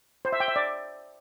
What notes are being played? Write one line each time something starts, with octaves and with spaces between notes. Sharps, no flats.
C5
E5
G5
E5
D5